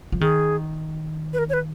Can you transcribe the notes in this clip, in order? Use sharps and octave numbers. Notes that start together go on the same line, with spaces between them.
F3
D#3 G#4
B4
A#4
C#5
B4